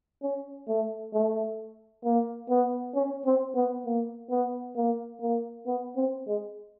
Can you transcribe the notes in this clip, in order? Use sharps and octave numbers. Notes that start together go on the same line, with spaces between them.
C#4
A3
A3
A#3
B3
C#4
C4
B3
A#3
B3
A#3
A#3
B3
C4
G#3